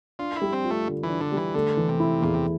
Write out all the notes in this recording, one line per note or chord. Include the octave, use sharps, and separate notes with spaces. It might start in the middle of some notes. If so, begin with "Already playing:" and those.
D4 F4
E4
G3
C4
F4
A3
D3
E3
D4
D3
E3 G3
D3 A3
E3
C3
E4
E2 A#2
C3